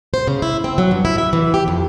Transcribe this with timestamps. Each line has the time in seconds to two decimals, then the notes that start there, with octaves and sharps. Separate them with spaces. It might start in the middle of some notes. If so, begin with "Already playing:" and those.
0.14 C5
0.27 C#3
0.42 E4
0.64 C4
0.78 F#3
0.91 G2
1.05 E4
1.18 E5
1.33 E3
1.54 G4
1.68 F2